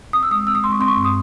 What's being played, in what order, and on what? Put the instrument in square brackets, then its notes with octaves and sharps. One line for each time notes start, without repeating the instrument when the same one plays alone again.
[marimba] C4 D#6
E6
G#3 D#6
C4 E6
D#6
G#3 C6
C#6
C4 C6
C#6
G2
D#6